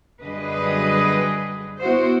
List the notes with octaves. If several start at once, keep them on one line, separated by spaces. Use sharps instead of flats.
F#2 D3 G3 G#4 B4 D#5
B3 E4 F#4 C5